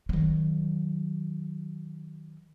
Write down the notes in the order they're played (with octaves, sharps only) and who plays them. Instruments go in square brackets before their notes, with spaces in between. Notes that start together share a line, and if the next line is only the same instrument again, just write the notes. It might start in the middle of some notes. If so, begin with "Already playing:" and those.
[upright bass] D#3 F#3